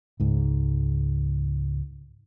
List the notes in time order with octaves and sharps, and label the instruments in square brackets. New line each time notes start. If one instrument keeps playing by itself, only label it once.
[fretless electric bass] C#2 G#2